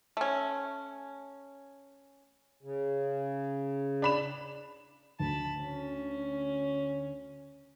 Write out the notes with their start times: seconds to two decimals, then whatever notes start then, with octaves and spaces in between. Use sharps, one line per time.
0.17 A3 C#4
2.63 C#3
4.02 D4 B5 E7
5.20 D2 A5 B5
5.63 C#4